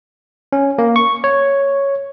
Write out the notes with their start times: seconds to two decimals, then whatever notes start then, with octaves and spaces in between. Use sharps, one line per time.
0.53 C#4
0.78 A#3
0.96 C#6
1.24 C#5